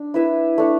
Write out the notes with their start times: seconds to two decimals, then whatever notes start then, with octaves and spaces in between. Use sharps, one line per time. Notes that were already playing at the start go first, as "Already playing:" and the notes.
Already playing: D4
0.14 E4 B4 E5
0.58 A3 D4 A4